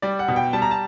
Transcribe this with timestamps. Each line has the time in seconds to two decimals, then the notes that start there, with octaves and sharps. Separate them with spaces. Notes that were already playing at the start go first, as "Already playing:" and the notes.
0.02 G3 D5
0.19 F#5
0.28 B2
0.36 G5
0.53 G3 A5
0.62 A#5
0.71 A5